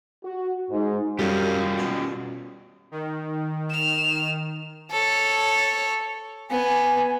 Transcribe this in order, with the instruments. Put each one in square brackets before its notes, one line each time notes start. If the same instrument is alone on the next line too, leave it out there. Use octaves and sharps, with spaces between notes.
[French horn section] F#4
G#2
[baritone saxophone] F#2 [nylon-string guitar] G3 [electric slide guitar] C#4 F4 G4
[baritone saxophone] B2
[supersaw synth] D#3
[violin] F6 E7
[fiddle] A4 C#5
[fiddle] B3 [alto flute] G#5